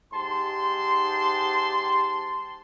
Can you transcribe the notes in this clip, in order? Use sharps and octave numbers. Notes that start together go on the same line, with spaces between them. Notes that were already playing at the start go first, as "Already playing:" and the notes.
G#2 G4 A5 C6